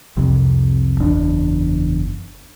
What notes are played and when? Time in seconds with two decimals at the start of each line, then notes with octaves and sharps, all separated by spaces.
0.17 C2 F2 C3
1.00 F#1 E2 D4